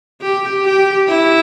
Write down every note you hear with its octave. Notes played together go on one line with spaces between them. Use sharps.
G4
G4
E4